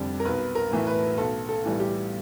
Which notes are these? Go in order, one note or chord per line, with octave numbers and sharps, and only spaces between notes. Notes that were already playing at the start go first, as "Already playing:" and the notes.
Already playing: F1 F2 D3 G3 D5
A#4
B1 B4
A#4
A2 E3 A3
B4
B1 A4
A4
A2 E3 G3
G4